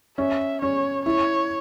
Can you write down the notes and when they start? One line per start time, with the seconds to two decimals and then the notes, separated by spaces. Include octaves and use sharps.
0.18 C#4 E5
0.61 C#4 C#5
1.05 E4 C#5